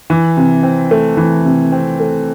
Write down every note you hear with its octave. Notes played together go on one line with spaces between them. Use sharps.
E3
C3
C4
A3
E3
C3
C4
A3